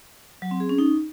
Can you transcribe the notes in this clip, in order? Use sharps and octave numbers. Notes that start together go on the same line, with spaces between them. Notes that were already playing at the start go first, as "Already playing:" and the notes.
F#3
C4
G#4
C#4
D#4